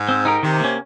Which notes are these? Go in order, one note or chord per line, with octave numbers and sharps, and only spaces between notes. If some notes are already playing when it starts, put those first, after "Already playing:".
Already playing: G#2
C4
D#4 G4 A#4
C3 D#3
A#3 C#4